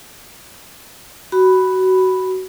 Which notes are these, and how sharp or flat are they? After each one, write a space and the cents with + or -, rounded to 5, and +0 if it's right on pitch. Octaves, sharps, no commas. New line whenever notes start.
F#4 +15 B5 +0